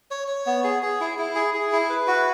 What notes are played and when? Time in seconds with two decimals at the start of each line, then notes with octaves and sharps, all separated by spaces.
0.11 C#5
0.28 C#5
0.46 B3
0.64 G#4
0.82 G#4
1.01 E4
1.18 E4
1.36 G#4
1.54 G#4
1.73 E4
1.90 B4
2.07 F#4